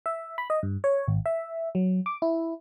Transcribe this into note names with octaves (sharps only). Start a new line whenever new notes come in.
E5
B5
D#5
G2
C#5
G#1
E5
F#3
D6
E4